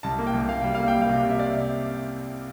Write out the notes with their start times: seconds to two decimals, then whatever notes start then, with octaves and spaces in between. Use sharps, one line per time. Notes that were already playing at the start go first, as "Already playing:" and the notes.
0.03 C2 A5
0.19 A#3
0.27 G5
0.34 C2
0.49 A#3 F5
0.62 G3 G5
0.75 A#3 F5
0.88 G5
0.94 G3
1.01 F5
1.09 C3
1.24 C3
1.31 E5
1.39 D5